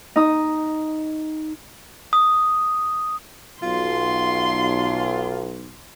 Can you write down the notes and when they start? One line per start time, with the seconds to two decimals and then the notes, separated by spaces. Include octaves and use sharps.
0.16 D#4 D#6
2.13 D#6
3.63 B1 F4 C6